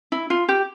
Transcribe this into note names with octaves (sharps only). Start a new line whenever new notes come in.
E4
F4
G4